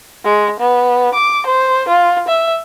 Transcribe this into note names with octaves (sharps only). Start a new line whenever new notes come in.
G#3
B3
D6
C5
F4
E5